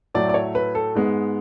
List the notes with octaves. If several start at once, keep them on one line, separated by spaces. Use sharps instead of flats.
A2 F#3 A3 D5
D5
C#5
B4
A4
G#2 G#3 B3